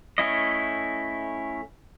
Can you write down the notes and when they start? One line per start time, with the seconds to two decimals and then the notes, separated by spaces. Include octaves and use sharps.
0.18 A3 C#4 E4 D#5